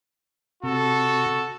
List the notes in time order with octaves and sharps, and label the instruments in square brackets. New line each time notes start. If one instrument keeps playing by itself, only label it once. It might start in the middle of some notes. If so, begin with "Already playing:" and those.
[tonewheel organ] C3 [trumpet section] F#4 A4